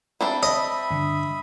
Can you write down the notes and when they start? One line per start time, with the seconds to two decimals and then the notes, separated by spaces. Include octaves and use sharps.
0.21 G3 C4 D4 E4
0.43 D#5 E5 B5 D#6
0.91 G2 D3